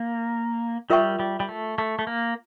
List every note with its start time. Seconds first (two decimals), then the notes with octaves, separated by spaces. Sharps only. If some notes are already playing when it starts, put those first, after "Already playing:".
Already playing: A#3
0.90 G3 F4 A#4 E5 G5 C#6
1.19 G3
1.40 G3
1.49 A3
1.78 A3
1.99 A3
2.07 A#3